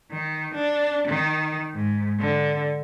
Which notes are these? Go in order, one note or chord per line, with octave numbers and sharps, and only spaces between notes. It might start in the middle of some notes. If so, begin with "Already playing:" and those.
D#3
D4
D#3
G#2
D3